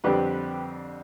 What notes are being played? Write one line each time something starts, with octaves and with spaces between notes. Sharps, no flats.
F2 D3 G3 C4 G4 B4